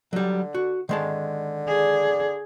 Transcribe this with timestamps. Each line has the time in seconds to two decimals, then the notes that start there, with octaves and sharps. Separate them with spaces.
0.13 D3 F#3 G3
0.54 F#4
0.89 D3 D#3 G#3 A5
1.67 G#4 D5